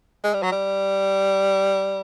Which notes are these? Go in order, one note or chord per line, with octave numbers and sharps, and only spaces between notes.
G#3
G3
F#3
G3